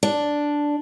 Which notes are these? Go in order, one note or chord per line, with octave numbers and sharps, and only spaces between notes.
D4